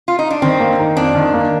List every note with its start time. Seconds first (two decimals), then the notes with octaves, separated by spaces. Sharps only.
0.08 F4
0.19 D#4
0.30 D4
0.42 D#3 C4
0.60 A#3
0.79 D#4
0.96 F2 D4
1.15 D#3
1.34 A#3